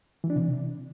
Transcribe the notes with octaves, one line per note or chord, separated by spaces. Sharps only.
E3
D4
C3